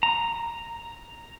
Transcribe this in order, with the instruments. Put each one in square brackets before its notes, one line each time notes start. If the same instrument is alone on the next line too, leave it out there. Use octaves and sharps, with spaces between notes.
[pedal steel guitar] A#5